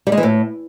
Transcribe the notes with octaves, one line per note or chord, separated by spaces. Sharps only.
G3
G#3
E3
A2